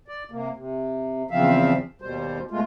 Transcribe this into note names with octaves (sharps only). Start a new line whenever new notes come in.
D5
C3 A#3
C3
E2 C#3 F3 C4 E5 F5
D#2 B2 G3 C5
B2 G#3 A3 F4